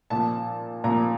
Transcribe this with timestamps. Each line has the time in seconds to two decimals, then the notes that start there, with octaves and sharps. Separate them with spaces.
0.10 A#2 F3 A5
0.84 A#2 F3 A#5